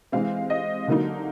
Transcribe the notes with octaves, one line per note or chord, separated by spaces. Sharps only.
E3 G#3 C4 F5
D#5
D3 F#3 A#3 D#4